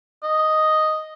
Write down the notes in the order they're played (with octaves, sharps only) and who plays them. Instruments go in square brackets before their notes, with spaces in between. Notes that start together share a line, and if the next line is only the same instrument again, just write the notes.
[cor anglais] D#5